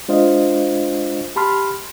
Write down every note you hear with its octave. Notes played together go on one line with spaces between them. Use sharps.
G#3 D4 F4 C5 D#5 F5
G4 A5 B5 C6 F6